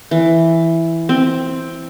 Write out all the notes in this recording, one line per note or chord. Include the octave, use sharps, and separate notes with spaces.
E3
C4